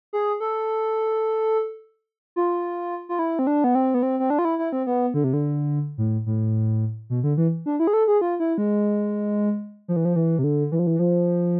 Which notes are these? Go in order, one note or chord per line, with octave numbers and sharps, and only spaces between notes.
G#4
A4
F4
F4
E4
C4
D4
B3
C4
B3
C4
C4
D4
F4
E4
E4
C4
B3
D3
C3
D3
A2
A2
B2
D3
E3
D4
E4
G#4
A4
G#4
F4
E4
G#3
F3
E3
F3
E3
C3
D3
E3
F3
E3
F3